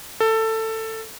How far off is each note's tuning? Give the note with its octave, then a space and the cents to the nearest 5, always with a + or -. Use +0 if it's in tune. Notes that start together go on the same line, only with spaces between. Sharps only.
A4 +15